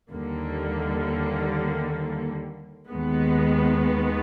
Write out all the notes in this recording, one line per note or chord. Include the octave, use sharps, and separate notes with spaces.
D#2 D3 G3 A#3
D#2 D#3 G#3 B3